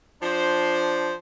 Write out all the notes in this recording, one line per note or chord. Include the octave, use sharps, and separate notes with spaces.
F3 D4 C5